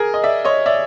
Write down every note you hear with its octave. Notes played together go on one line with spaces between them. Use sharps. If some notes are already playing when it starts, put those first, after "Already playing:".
Already playing: G#4 A#4
D#5
D5 E5
C#5 D#5
D5 E5